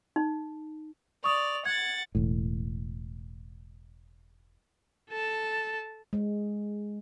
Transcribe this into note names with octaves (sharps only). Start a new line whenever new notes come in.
D#4
D5 C#6 D#6 F7
F#5 G#6 A6
E1 A2
A4 A5
G#3